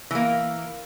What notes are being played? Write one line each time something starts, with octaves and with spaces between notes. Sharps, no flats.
E3 A#3